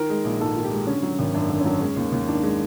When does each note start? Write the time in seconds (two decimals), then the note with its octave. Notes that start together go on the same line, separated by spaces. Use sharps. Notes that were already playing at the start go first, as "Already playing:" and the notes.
Already playing: D#3 A#4
0.10 G#3
0.25 A#1
0.41 G#2 A4
0.57 D#3
0.64 G4
0.72 G#3
0.87 D3 C#4
1.03 F#3
1.19 G#1
1.34 F#2 D4
1.49 D3
1.61 C#4
1.65 F#3 D4
1.80 G#3 C#4
1.96 D#2
2.12 D#2
2.28 D#3 D4
2.43 G#3